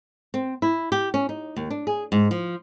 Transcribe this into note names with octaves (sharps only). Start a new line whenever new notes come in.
C4
E4
G4
C#4
D#4
D#2
D4
G#4
G#2
F3